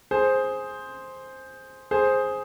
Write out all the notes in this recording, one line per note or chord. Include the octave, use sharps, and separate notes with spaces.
G#4 C5
G#4 C5